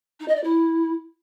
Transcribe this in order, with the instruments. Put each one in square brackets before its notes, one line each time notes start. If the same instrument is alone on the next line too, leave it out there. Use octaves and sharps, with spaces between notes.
[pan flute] D#4
D#5
D5
E4